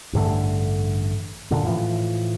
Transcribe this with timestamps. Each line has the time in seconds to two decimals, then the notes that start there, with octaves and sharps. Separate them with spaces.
0.13 A1 G2 D3 A3
1.50 F#2 A#2 D3
1.67 A2 E3 F3